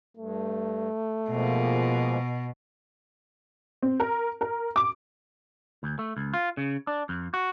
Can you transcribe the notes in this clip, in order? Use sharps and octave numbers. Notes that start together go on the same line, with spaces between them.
G2 A3
B2 F3 G#3 A#3
C4
A#4
A#4
D6
D2
A3
C#2
F4
C#3
D4
F2
F#4